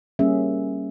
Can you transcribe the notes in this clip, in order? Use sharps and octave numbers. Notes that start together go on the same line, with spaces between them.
G3 A#3 C#4 G#4 E5